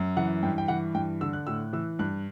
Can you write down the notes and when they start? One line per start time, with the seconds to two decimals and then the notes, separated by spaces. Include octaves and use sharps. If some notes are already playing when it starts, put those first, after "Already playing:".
Already playing: F#2
0.17 E3 F#5
0.42 G2 G5
0.58 G5
0.68 E3 F#5
0.94 G2 G5
1.21 D3 E6
1.33 F#6
1.47 A2 E6
1.73 E3 E6
1.99 G2 F#6